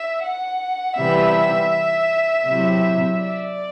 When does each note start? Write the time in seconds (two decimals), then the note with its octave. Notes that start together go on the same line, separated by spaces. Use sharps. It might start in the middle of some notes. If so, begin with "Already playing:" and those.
Already playing: E5
0.23 F#5
0.98 C3 E3 G3 B3 E5
2.46 C3 F#3 C4 E4
3.21 D5